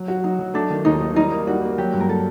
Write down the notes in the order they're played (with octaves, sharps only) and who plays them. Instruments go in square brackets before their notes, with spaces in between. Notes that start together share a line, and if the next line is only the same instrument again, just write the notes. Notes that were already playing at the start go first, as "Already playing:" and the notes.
Already playing: [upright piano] F#3
F#4
[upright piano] F#3 [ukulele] D#4
[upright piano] F#3
[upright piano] A3 [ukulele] D4
[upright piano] D#3
[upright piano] D#2 [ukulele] D#4
[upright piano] D#3
[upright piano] G3 [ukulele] D#4
[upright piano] A#3
[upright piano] G3 [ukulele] F#4
[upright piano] A#3
[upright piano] F#3 [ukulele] G4
[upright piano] G2
[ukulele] A#4
A4